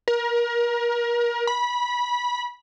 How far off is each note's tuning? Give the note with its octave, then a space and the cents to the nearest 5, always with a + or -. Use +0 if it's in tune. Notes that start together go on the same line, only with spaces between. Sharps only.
A#4 +30
B5 -20